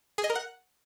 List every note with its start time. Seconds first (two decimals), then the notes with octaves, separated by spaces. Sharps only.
0.18 G#4
0.24 D#5
0.30 A#4
0.35 F#5